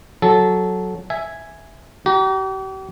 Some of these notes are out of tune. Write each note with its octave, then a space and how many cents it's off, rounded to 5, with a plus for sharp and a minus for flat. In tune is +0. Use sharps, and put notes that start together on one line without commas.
F#3 +0 A4 -15
E5 +0 G#5 +0
G4 -40 A#5 +5